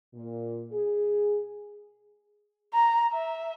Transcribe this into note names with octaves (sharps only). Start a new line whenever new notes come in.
A#2
G#4
A#5
E5